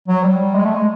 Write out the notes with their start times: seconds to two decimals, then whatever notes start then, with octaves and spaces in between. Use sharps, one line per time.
0.08 F#3
0.24 G3
0.55 G#3
0.65 A3
0.75 G#3